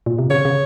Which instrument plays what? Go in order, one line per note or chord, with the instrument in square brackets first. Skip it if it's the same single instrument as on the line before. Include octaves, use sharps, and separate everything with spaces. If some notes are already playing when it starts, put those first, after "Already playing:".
[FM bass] A#2
C3
[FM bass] C#3 [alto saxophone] C#5
[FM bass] C#3